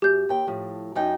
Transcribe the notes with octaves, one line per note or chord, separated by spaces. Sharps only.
F#2 G4 G6
D#2 G5
A2 F3
F#2 D#4 G5